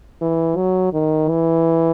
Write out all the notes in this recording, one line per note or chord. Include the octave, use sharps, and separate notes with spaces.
E3
F#3
D#3
E3